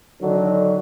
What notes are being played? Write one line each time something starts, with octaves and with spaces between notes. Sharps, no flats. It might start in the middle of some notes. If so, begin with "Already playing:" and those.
D3 D#3 F#3